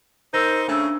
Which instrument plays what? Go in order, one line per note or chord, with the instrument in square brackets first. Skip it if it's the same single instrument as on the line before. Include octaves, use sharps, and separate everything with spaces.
[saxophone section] D#4 C5 [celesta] A#4 E6 A#6
[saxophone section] C#3 A3 [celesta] D4 E6